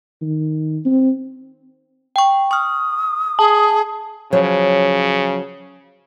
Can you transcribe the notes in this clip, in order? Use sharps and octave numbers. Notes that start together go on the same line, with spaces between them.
D#3
C4
G5 C#6
C#6 D#6 F6
G#4 A5
C#3 F3 F#3 C#5